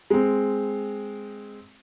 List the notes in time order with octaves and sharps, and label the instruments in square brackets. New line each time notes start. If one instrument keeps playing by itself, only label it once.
[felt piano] G#3 C4